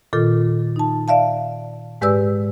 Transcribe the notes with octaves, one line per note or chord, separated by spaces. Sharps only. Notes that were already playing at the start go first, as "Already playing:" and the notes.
A#2 D#3 F4 A4
D#4 A5
D5 E5 F5 A5
G#2 G#3 G4 B4 D5 E6